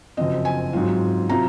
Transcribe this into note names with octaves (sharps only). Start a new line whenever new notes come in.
F#1 F#2 F3 C4 D#5
G#5
G#2 F#3 C4 F4
C3 F#3 C4 F4 A#5